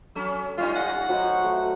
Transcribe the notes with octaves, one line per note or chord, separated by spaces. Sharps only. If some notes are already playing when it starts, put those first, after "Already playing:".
F#3 C#4 A4
G3 C#4 D#4 F4
F#5
A2 F#3 C5 D#5
A3